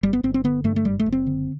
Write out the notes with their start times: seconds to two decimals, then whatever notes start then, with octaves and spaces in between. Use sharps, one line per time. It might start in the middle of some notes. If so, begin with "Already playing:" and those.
0.03 G1 G3
0.13 B3
0.23 G1 C4
0.34 C4
0.44 D3 B3
0.64 G2 A3
0.76 A3
0.85 F#1 G3
0.99 A3
1.06 F#1
1.12 C4
1.27 D3